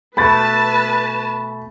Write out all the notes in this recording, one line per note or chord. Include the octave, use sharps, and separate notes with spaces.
B2 A3 B4 A5 B5 A6